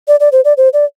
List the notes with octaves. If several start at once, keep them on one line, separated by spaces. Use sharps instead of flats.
D5
D5
C5
D5
C5
D5